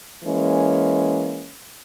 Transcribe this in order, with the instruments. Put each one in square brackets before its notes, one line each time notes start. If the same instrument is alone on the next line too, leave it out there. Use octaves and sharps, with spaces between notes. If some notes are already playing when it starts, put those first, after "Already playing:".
[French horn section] E3 G#3 A#3 C#4